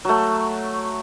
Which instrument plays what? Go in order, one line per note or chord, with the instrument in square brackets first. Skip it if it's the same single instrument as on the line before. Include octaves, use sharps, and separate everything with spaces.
[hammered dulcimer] F#3 A3